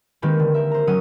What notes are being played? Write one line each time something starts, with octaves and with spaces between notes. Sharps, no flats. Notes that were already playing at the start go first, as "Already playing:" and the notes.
D#3 G#3 A#3 C4 G4 B4
D3
A#4 E5
C5 A#5
F#3 C#4 F#5 D#6